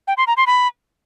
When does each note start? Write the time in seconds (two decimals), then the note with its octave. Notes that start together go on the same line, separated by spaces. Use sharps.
0.07 G5
0.17 C6
0.27 A#5
0.37 C6
0.47 B5